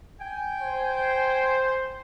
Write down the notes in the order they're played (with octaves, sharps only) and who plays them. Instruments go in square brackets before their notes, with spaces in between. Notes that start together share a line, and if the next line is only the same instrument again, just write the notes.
[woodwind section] G5 G#5
[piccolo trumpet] C5